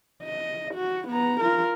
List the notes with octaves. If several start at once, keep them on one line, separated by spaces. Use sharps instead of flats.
D#5
F#4
B3 A#5
F4 A#4